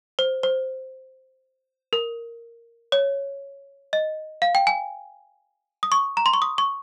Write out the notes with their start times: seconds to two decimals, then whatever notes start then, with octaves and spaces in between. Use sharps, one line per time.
0.19 C5
0.43 C5
1.93 A#4
2.92 C#5
3.93 D#5
4.42 F5
4.55 G5
4.67 G#5
5.83 D#6
5.92 C#6
6.17 A#5
6.26 C6
6.34 C#6
6.42 D#6
6.58 C#6